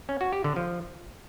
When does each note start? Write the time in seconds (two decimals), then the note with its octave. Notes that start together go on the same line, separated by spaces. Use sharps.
0.09 C#4
0.21 F#4
0.33 G4
0.44 D3
0.56 F3